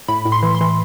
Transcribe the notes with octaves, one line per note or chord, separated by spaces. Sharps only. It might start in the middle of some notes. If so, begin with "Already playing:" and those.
A2 B5
A2
C6
E3
C6
E3